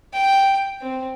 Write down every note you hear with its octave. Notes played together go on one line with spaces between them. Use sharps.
G5
C4